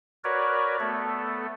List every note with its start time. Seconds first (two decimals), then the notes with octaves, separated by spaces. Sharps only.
0.24 F#4 A#4 B4 C#5 D5
0.80 A3 B3 A4